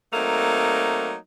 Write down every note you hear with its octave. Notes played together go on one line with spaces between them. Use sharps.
F#3 A3 A#3 C4 D#4